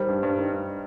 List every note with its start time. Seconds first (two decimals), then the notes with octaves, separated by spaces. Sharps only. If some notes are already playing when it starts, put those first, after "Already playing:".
Already playing: D#3 G3 C5
0.09 G2
0.23 G2
0.38 D#3
0.52 G2